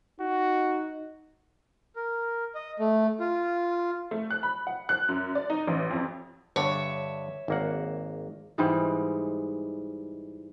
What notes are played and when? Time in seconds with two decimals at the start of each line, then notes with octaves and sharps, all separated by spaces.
0.20 D#4 F#4
1.96 A#4
2.55 D#5
2.80 A3
3.20 F4
4.11 A3
4.30 F#6
4.43 B5
4.67 F#5
4.89 F#6
5.08 F#2
5.35 D5
5.50 D#4
5.67 A1
5.91 F2
6.56 G2 D3 C#5 E5
7.48 G#1 A#3 F#5
8.58 G#2 E3 G3 G#3